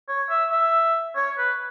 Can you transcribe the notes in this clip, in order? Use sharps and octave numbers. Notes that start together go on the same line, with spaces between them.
C#5
E5
E5
C#5
B4